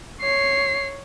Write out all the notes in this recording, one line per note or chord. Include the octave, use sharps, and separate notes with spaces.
C#5 C7